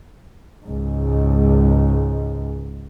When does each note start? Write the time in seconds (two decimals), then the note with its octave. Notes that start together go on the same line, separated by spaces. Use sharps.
0.66 C#2 G#2